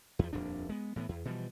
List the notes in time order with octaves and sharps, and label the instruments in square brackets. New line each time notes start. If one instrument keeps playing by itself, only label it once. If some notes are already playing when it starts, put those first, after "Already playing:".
[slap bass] E2 F3
D#1 F2 A#2 D4
G#3 B3
A2 E3 A#3 B3
E2
B2 E3 F3 G3